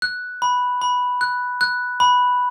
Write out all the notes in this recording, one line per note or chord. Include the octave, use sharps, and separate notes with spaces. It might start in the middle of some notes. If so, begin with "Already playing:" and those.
F#6
B5
B5
F#6
F#6
B5